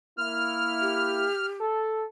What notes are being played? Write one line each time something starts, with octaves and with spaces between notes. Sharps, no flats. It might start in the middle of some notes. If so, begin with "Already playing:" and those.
A#3 E4 F6
G4
A4